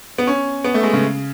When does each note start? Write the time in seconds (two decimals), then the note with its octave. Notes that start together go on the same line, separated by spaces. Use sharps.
0.18 B3
0.27 C#4
0.64 B3
0.74 A3
0.83 G#3
0.93 C#3